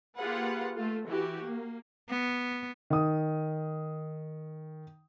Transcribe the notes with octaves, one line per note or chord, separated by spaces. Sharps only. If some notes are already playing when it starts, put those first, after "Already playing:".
A#3 F4 G4 G#4 B4 F#5
A3 F4 A4
E3 F#4 G4
A#3
B3
D#3 D#6